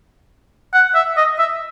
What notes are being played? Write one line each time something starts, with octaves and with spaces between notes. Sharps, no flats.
F#5
E5
D#5
E5